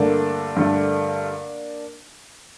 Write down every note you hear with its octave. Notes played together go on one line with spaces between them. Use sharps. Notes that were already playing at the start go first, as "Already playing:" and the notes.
Already playing: G2 D3 A3 A#3 D4
G2 D3 A3